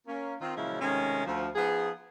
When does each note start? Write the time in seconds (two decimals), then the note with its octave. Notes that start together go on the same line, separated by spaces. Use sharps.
0.07 A#3 C#4
0.41 D#3 C4 F4
0.57 A#2 C#3 F3 F#3 G#3 E4
0.81 C3 D#3 G#3 A3 C#4
1.27 D2 F3
1.56 F3 B3 D#4 G#4